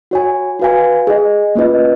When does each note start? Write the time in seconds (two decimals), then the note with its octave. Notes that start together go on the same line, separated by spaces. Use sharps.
0.11 F#4 C#5 G#5
0.59 F#4 B4 F5 G#5
1.07 G#4 D#5 G#5
1.55 A#3 C#4 F4 B4 D#5